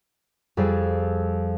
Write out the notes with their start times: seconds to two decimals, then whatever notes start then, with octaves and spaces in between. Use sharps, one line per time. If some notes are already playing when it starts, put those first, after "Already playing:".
0.57 F2 G3 G#4 D5